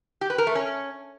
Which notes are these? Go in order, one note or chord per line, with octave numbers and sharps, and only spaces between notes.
G4
B4
A#4
A3
C#4